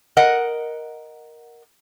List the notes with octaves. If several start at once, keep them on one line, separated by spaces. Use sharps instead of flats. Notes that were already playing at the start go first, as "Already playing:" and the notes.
A#4 D#5 F#5